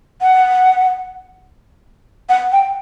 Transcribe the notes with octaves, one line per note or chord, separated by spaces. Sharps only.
F#5
F#5
G5